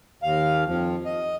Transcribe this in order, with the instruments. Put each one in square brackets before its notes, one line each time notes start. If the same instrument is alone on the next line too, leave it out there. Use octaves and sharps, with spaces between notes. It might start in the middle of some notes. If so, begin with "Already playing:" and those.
[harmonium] D#2 F5
F2 F3
D#5